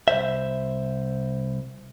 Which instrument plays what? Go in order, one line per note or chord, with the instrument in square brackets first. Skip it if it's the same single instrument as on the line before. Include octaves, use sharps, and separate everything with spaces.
[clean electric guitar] C2 A#2 C5 E5